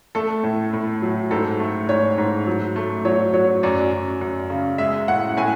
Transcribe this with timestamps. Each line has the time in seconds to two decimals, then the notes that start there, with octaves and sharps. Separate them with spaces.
0.15 A3 A4
0.44 A2
0.73 A2
1.02 F#3
1.31 G#2 A4
1.60 A3
1.89 G#2 C#5
2.18 G#2
2.47 F#3
2.76 A3
3.05 F#3 C#5
3.34 F#3 C#5
3.63 F#2 D5
3.93 F#2
4.21 F#2
4.50 C#3
4.78 G#3 E5
5.08 A2 F#5
5.37 A2 G#5